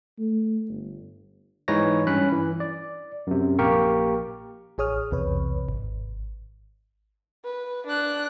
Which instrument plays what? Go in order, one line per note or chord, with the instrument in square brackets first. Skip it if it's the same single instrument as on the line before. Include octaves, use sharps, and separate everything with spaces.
[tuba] A3
G1
[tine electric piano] G#2 E3 D#4 B4 C#5 A#6
G2 C#4 B5 F#6
E3
D5
F#2 C3
A#1 A#3 G4 A#4 C#6
[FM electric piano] A1 G#4 C#5 D#6 F6
B1 E2 C3 B4 C#5
G#1
[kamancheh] B4
D4 F#6